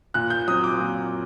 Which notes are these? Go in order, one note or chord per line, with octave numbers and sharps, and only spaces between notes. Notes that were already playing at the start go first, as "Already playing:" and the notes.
A#2 F#6
G6
F#3 C4 D#6
D6
A#2